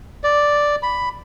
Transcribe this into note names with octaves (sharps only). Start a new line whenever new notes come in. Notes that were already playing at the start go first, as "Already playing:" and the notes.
D5
B5